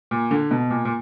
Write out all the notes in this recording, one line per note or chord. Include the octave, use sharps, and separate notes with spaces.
A#2
D3
B2
A#2
A#2